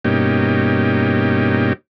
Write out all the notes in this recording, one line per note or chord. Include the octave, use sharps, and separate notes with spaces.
G2 B2 A#3 C#4 D#4 G4